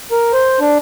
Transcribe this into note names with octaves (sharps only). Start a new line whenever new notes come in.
A#4
C5
D4